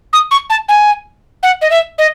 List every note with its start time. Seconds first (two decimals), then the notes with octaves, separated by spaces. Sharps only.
0.13 D#6
0.31 C#6
0.50 A5
0.69 G#5
1.43 F#5
1.61 D#5
1.70 E5
1.98 D#5